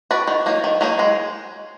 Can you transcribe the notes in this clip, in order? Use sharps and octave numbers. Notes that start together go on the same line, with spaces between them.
F#4 B4 D5
D#3
F#3 A#3 D#4
D#3
F#3 A#3 D#4
G#3